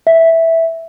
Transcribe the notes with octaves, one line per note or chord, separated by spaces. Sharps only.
E5